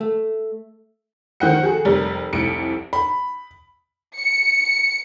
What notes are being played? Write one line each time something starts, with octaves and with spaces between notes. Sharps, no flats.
A3
D#3 F3 C5 F#5 G5 C#7
F#4 G#4 A4
F1 G3 A#4
F1 C2 C#7 D7
B5
C#7